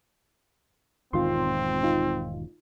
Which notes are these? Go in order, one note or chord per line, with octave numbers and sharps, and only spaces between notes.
E1 G#2 D#3 C4 F4 C6
D#4 F4